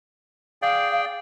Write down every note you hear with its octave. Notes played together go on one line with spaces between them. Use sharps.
G#4 D5 F5 G5